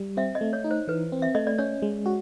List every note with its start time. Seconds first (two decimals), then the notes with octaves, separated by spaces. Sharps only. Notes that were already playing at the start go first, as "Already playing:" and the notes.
Already playing: G3
0.17 C4 E5
0.35 D#5
0.41 A3
0.53 C#5
0.64 D#4
0.71 C5
0.88 E3 B4
1.12 C4
1.22 E5
1.35 A3 D#5
1.47 D5
1.58 C#4 C#5
1.82 G#3
2.06 F#4